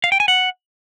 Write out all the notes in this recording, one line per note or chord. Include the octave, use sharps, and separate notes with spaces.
F5
G5
G#5
F#5